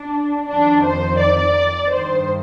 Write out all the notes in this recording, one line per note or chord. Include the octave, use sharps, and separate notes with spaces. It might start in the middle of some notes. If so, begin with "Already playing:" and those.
Already playing: D4
F2 D#3 D4
C5
D5
G2 D#3 C5